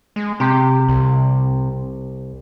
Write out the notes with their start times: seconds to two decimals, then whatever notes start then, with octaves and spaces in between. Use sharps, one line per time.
0.16 G#3
0.40 C3 G4
0.88 C2